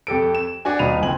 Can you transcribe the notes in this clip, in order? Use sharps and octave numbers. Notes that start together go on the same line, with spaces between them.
F2 G4 A4 D7
E7
D4 F#4 G#5
D#1 D#4 F4 B5 D#7 F7
F#1 C4 G#5 F#7